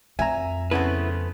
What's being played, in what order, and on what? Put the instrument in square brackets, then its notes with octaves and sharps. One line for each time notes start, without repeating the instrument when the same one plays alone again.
[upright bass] F2 F4 [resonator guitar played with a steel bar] E5 [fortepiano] G#5 A#5
[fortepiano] C#3 [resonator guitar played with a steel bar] A3 B3 C4 [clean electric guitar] E4 B4